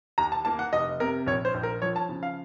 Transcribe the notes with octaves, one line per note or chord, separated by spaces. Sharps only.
D#2 A#5
A5
A#3 A5
F#5
F1 D#5
C3 A#4
A#1 C#5
C5
A#1
A#4
F3 C#5
A5
C#3
F5